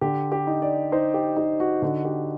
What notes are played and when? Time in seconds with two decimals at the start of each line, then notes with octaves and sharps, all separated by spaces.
0.01 D3 G4
0.32 G4
0.47 D#4
0.62 D5
0.92 D#4 C5
1.14 G4
1.36 D#4 G4
1.60 F#4
1.82 D3 F#4
2.05 G4